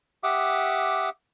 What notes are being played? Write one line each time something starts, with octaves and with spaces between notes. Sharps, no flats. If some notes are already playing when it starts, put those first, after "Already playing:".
G4 E5 F#5 D6 D#6